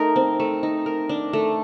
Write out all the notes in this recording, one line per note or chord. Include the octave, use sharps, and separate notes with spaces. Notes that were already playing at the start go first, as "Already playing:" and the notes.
Already playing: A3 D#4 A#4
C4
A3
D#4
A#4
D4
A3